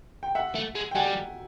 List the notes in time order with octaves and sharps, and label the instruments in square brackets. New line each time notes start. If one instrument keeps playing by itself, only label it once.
[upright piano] G5
E5 F#5
[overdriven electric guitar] A3
G#3
[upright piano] G5
[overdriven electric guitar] G3 [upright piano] F#5 G#5